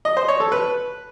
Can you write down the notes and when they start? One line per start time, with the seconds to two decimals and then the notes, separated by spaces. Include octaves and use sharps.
0.05 D#5
0.17 C5
0.28 C#5
0.40 A4
0.52 B4